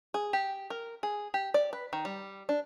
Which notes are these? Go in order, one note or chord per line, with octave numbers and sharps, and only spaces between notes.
G#4
G4
A#4
G#4
G4
D5
B4
D#3
G3
D4